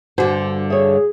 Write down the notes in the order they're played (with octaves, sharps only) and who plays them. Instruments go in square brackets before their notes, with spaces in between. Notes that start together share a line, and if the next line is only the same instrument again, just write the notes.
[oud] G2 D3 [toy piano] D4 F#4 F#5 [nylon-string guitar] C5
[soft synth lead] G#4 [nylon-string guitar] C#5 E5